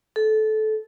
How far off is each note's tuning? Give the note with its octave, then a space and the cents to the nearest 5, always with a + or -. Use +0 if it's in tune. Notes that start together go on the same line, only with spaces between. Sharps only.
A4 -20